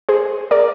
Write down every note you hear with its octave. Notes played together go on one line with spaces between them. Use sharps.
G#4 C5
A#4 D5